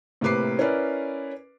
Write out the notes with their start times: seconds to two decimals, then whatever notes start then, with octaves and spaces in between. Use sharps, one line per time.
0.21 A2 C3 A#3 B4 D6 C7
0.59 C#4 E4 A#4 B4 D5